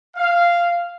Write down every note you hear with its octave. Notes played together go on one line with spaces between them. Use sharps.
F5